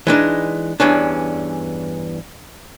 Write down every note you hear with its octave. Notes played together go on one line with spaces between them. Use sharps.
E3 G#3 D4 D#4
E2 G2 E3 C#4 D4